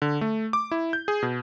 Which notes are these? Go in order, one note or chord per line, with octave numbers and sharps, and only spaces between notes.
D3
A3
D6
E4
G6
G#4
B2